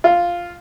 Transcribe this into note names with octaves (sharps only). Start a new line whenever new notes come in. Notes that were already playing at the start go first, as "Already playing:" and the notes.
F4